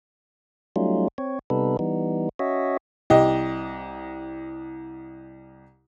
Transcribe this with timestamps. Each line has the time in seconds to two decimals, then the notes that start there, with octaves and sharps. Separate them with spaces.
0.76 F#3 G3 A3 C#4 D#4 F4
1.18 C4 C#5
1.50 C3 G3 B3 D#4 A4 B4
1.79 E3 G3 B3 D#4
2.39 C#4 F#4 C#5 D#5 E5
3.10 C2 G4 D#5